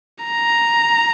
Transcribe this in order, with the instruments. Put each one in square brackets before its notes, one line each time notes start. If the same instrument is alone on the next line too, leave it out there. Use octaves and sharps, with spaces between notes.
[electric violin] A#5